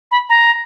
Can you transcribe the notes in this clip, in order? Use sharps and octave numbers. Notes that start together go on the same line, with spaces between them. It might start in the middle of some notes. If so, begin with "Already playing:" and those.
B5
A#5